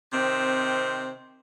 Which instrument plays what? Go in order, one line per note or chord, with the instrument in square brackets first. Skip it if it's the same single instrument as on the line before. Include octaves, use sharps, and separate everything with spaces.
[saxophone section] C3 D#3 C4